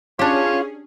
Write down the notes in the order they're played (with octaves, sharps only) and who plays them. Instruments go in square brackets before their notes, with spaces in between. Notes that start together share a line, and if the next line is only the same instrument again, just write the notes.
[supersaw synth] C#4 G#4 [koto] D4 G4 [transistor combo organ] F4 [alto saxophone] C#5